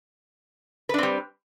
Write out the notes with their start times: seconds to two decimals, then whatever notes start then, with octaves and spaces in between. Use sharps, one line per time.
0.89 B4
0.94 D4
0.98 C4
1.03 G3